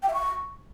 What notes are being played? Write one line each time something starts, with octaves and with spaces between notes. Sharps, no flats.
G5
E5
C#6